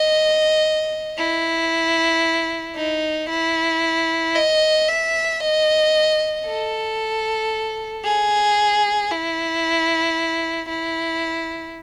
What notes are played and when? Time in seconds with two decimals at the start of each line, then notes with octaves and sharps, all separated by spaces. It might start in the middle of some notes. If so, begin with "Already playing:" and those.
Already playing: D#5
1.18 E4
2.76 D#4
3.29 E4
4.35 D#5
4.88 E5
5.41 D#5
6.46 A4
8.05 G#4
9.11 E4
10.69 E4